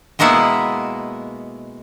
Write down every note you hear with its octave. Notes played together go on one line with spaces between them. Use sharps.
B2 G#3 A#3 B3 E4